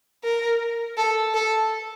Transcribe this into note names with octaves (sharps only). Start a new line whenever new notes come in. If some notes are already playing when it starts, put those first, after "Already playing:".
A#4
A4
A4